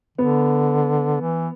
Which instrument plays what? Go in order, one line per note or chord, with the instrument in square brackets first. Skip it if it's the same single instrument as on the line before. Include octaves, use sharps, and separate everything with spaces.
[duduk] D3 [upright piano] B3
[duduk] E3